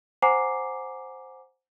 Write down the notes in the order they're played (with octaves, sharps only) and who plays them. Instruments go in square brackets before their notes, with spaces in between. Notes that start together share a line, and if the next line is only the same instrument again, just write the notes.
[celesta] C5 F#5 G#5 A#5 D6 C7